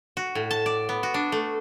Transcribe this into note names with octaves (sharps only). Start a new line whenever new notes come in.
F#4
A2
A5
D5
B3
F#4
D4
A3